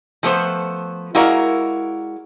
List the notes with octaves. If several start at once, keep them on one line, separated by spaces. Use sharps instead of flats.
F3 A3 B3 C5
G#3 E4 F#4 A#4 D5 F5